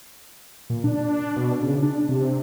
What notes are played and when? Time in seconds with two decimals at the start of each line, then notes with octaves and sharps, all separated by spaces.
0.70 A#2
0.84 D4
1.36 B2
1.62 C#3
1.82 D4
2.09 C3